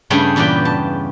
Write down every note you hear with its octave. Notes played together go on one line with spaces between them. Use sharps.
G2 C#3 A3 G#4 G5 G#5
E2 A#2 F4 G4 B4 G5
A5